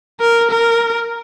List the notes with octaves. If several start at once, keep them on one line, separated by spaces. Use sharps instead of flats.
A#4
A#4